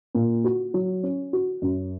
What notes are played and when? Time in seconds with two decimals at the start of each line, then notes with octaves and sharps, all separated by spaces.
0.15 A#2
0.44 F#4
0.74 F#3
1.03 C#4
1.33 F#4
1.62 F#2